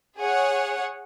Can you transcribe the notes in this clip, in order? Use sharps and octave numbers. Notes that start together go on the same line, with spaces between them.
G#4 C#5 F#5